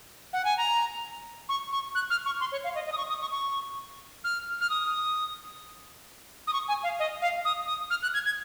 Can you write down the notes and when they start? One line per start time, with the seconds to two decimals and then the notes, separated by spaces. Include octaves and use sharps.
0.33 F#5
0.45 G#5
0.57 A#5
1.49 C#6
1.72 C#6
1.95 F#6
2.10 F6
2.26 C#6
2.40 C6
2.52 C#5
2.64 F5
2.75 D#5
2.86 D#5
2.92 D#6
2.98 C#6
3.09 D#6
3.21 C#6
3.32 C#6
4.24 F6
4.61 F6
4.70 D#6
6.47 D#6
6.53 C#6
6.68 G#5
6.83 F5
6.99 D#5
7.22 F5
7.45 D#6
7.67 D#6
7.90 F6
8.02 F#6
8.14 G#6
8.25 G#6